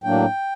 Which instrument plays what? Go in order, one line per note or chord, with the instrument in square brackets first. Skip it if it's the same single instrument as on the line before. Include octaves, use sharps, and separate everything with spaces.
[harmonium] A2 F#3 A#3 D4 G5